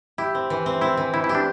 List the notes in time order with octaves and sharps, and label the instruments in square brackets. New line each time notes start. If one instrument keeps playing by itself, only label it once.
[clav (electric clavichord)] E4 [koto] G4
[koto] C4
E3
C4
[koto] C4 [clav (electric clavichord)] E4
[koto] E3
[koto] E3 [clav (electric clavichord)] E4
[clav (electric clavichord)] E4
[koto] G4
[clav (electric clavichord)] D4